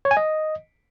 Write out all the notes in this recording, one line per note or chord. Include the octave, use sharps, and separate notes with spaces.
C#5
G#5
D#5